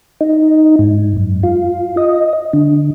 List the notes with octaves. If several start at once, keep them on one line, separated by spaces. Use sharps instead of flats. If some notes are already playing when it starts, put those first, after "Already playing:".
D#4
G#2
F#2
F4
D#5
D3